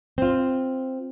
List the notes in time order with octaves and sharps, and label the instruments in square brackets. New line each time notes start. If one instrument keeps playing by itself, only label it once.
[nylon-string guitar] C4 F4